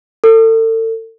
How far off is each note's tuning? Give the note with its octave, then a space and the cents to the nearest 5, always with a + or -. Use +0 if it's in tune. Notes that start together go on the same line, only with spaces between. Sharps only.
A4 +35